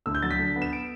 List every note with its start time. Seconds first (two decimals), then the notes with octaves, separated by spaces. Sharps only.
0.06 D2 E6
0.15 G6
0.22 F#3 A6
0.31 B6
0.39 D3
0.56 B3
0.62 E7
0.73 D7